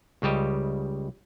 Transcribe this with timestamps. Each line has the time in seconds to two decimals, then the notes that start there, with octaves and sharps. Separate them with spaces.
0.22 C#2 C#3 G3 G4 D#5